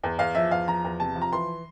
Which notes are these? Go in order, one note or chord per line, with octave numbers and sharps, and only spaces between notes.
E2
E2 F5
F3 E5
E2 F5
F3 A#5
E2
C3 A5
F3
A#5
E3 C6